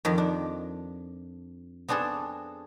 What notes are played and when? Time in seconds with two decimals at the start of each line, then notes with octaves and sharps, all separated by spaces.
0.05 F2 D#3
0.18 D4
1.88 B3 C4 D4 G#4 A4